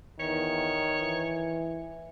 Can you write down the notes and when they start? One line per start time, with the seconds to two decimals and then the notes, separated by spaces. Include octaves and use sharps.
0.20 E2 D#3 C#5
0.99 E3